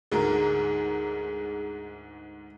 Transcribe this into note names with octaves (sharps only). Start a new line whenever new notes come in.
D2 G#2 G#4 A#4